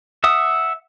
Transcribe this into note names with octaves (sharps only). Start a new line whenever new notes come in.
E5 F#5 D#6